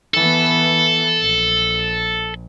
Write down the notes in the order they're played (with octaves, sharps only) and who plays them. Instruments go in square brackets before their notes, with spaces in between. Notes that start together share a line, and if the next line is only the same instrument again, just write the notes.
[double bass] E3 B3 [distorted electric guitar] A4
[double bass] A#1